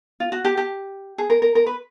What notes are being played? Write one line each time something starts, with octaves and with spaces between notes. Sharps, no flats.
F4
F#4
G4
G4
G#4
A#4
A#4
A#4
B4